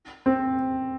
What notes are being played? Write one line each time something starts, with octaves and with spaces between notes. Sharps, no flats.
C4